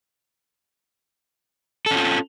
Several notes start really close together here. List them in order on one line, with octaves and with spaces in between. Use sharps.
A4 C#4 F4